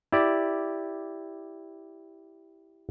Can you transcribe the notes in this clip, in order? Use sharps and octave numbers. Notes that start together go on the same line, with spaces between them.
E4 G4 D5